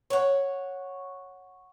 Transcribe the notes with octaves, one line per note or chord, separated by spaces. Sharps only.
C#5 F#5